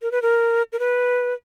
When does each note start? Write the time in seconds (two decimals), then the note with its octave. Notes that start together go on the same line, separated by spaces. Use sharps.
0.02 A#4
0.12 B4
0.22 A#4
0.73 A#4
0.79 B4